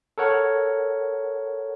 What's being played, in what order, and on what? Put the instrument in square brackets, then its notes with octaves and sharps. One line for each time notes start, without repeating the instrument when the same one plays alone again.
[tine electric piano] A4 A#4 C#5 F#5